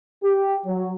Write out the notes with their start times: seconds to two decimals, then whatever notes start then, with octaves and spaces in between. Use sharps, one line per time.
0.23 G4
0.66 F#3